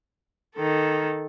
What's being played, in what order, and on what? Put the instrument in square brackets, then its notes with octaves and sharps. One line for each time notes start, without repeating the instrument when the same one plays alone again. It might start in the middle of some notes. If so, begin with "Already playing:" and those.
[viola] D#3 A4